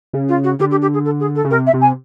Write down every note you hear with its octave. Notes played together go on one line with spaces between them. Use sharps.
C#3
F4
F#4
D3 G4
G4
G4
G#4
A4
G#4
A4
C#3
C3 A#4
E5
C3
G#5